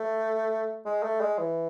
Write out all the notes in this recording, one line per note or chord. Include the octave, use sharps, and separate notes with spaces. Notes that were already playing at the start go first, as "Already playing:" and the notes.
Already playing: A3
G#3
A3
G#3
E3